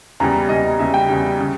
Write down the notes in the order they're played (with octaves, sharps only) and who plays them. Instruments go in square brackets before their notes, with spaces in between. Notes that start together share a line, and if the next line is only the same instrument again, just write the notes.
[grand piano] E2 C#3 G3 A#5
E2 C#3 G3 D#5
E2 C#3 G3 E5
G5
E2 C#3 G3
C#3